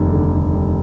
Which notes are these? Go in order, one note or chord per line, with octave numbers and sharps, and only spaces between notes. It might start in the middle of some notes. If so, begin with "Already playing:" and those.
Already playing: F1 D#2 G3
D3
D#2
G3